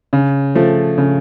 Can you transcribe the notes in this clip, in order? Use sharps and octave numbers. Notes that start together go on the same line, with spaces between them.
C#3
F3 A3
C#3